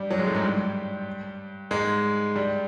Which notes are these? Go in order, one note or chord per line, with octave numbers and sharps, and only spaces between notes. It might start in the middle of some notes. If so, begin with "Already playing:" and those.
Already playing: G2 G3
F#2 F#3
G#2 G#3
A2 A3
G#2 G#3
G2 G3
G#2 G#3
G2 G3